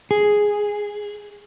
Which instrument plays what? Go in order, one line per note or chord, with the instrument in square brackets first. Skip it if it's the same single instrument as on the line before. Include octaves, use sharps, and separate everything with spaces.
[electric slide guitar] G#4